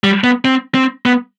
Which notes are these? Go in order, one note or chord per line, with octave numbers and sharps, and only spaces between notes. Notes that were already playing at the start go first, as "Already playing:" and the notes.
G3
B3
C4
C4
B3